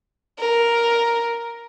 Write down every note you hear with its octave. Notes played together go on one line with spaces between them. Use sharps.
A#4